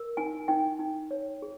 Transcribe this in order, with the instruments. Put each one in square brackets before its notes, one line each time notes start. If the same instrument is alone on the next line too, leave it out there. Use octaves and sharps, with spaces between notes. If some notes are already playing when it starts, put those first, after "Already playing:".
Already playing: [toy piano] A#4
D#4 G#5
D#4 G5
D#4
C#5
G#4